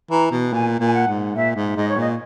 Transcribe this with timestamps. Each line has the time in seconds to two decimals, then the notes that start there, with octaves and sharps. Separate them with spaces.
0.10 E3 A#5
0.31 B2
0.52 A#2 G#5
0.80 A#2 G#5
0.94 F#5
1.08 G#2
1.35 A#2 E5
1.56 G#2
1.76 G#2 D#5
1.89 C#5
1.97 A#2 D#5